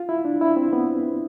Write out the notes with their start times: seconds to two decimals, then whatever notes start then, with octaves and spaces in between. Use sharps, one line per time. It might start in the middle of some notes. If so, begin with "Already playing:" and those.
Already playing: F4
0.09 E4
0.25 D4
0.41 E4
0.57 C4
0.73 B3